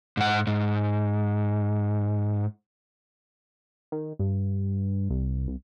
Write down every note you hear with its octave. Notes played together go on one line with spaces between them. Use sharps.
G#2 F#5
G#2
D#3
G2
C2
C2